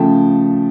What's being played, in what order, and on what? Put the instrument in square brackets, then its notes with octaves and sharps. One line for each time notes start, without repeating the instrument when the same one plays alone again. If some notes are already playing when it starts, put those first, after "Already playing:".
Already playing: [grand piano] C#3 F3 A3 G5 A5